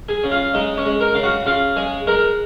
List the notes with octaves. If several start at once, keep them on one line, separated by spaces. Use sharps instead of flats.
G#4 G#5
C#3
F4 F5
G#3 D#4 D#5
C#4 C#5
G#3
A#4 A#5
C#3 F5
F#4 F#5
C#3 F4 F5
G#3 G#4 G#5
G#3 A#4 A#5